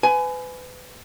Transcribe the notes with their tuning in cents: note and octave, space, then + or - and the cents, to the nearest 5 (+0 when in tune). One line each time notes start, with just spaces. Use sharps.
B4 +30 G#5 +15